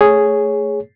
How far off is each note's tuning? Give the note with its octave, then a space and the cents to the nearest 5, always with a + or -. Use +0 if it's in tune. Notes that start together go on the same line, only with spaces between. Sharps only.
A3 +0 G#4 +0 C#5 +0